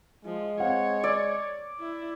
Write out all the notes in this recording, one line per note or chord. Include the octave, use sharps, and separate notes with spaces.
F3 G#3
C4 C#5 F5 F#5
D5 E6
E4